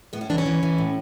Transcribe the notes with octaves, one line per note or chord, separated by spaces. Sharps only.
A2 B3
C#4
E3 D4
C#4
E3
E3
A2